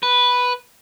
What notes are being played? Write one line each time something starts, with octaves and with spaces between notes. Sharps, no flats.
B4